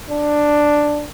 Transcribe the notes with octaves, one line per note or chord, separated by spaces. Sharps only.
D4